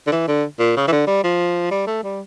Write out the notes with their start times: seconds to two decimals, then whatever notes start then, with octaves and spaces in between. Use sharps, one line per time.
0.07 D3
0.12 E3
0.28 D3
0.59 A#2
0.77 C#3
0.88 E3
0.92 D3
1.07 G3
1.24 F3
1.71 G3
1.87 A3
2.04 G3